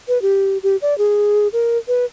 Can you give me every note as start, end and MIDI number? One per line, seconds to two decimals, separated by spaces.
0.08 0.21 71
0.22 0.58 67
0.63 0.76 67
0.82 0.97 74
0.98 1.48 68
1.53 1.78 70
1.88 2.05 71